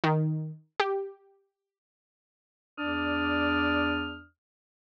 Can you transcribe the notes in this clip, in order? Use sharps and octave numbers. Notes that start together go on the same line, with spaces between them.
D#3
G4
E2 D4 D5 D#6 F6